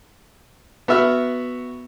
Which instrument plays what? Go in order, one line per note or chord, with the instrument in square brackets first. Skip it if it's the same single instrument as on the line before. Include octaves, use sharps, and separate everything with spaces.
[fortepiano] B3 F#4 E5 F6